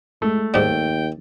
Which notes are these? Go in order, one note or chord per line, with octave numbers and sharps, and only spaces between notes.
G#3 A3
D#2 G#2 G3 G5